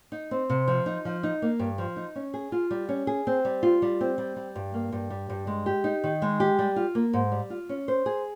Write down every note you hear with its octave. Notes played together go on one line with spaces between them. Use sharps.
D#4
C4
C3
F3
D#4
F3
D#4
A#3
G2
F3
D#4
C#4
G#4
F4
G3
C#4
G#4
C4
G3
F4
G3
C4
G3
G3
G2
A#3
G2
G3
G2
G#3
G4
D#4
D#3
G#3
G4
G3
F4
A#3
G#2
G3
F4
C#4
C5
G#4